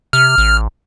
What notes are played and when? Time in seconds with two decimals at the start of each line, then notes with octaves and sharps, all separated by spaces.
0.13 C3 F6
0.38 A1